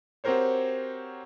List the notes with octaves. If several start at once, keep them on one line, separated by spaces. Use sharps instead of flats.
C4 F#4 G4 A#4 C5 C#5